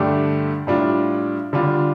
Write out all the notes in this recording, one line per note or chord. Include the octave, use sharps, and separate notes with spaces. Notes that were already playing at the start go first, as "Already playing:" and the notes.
Already playing: G2 D3 A3 D4 G4
A2 G3 D4 F4
D3 G3 D4 F4